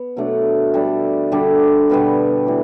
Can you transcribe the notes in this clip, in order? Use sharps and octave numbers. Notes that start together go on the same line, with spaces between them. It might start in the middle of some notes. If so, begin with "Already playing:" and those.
Already playing: B3
B2 F#3 A3 D4
G3 D4 A4
D3 G3 D4
B2 G3 B3 F#4
A2 E3